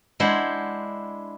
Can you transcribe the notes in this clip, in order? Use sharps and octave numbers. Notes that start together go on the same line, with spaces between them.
G#3 D4 E4 C5 F#5